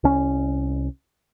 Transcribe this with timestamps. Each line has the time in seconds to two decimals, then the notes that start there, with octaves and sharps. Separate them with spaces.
0.04 C2 C#4